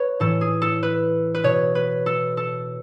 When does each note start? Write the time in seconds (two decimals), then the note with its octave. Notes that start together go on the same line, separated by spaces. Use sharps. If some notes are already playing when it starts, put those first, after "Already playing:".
Already playing: B4 C#5
0.20 A2 E3 A4
0.41 G#4
0.62 A4
0.83 B4
1.35 B4
1.44 B2 C#5
1.75 B4
2.06 A4
2.37 A4